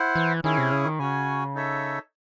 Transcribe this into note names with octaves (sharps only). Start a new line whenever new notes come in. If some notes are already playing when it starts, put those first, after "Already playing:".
Already playing: E4 C5 F#5
E3
D#3 C#4 E4 G#4
C3
C#3
D#3
C#3 C#4 F#4 C#5 G#5
D#4 A4 C#5 E5